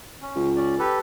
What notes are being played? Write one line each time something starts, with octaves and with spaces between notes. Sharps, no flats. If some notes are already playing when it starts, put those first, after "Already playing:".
C#4
C#2
C#4 D5
G4 A4 B4